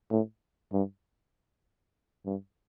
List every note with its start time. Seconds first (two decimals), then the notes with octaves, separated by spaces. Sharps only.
0.12 A2
0.73 G2
2.26 G2